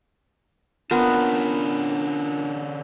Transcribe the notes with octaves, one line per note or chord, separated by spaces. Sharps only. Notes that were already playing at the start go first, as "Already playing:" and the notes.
D3 B3 C#4 D4 F4 A#4 A5